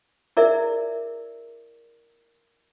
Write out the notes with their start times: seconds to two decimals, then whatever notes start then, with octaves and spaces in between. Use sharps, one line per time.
0.37 E4 G#4 A#4 D5 E5